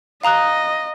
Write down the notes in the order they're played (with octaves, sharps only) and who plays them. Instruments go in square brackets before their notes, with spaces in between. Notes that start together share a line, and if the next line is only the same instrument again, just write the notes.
[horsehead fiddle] D#5 [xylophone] F5 A#5 D#6 F#6